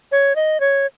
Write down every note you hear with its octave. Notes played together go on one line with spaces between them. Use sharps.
C#5
D#5
C#5